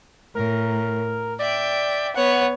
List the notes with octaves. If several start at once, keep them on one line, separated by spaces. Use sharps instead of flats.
A2 A#4
D5 E5 G5
B3 C#5 F#5